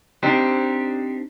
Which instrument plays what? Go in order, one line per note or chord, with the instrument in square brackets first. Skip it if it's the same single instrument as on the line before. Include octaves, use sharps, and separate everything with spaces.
[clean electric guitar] C4 D4 D#4 G4 C5